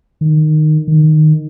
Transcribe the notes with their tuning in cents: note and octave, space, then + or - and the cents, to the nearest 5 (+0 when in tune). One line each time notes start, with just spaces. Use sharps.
D#3 -15
D#3 -10